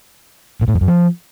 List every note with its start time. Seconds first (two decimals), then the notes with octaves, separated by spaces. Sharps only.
0.61 A#2
0.68 A2
0.74 F2
0.81 F#2
0.88 F3